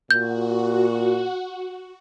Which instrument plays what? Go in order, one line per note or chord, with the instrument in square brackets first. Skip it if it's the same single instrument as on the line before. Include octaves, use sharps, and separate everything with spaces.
[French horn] A#2 [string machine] F#4 [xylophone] G6